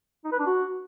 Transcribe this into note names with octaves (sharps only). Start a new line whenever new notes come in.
D#4
B4
D4
F#4